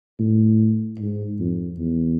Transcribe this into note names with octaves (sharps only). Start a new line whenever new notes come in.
A2
G#2
F2
E2